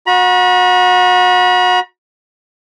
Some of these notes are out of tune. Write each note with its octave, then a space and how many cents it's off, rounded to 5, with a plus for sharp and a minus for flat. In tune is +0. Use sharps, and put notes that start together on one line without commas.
F#4 -30 B5 -45